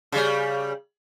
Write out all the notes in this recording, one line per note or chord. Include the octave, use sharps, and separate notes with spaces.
C#3 G3